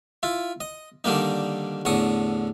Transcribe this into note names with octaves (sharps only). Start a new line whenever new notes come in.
E4 F4
D#5
D3 D#3 G3 A#3 D#4
A1 E2 D3 C#6 D#6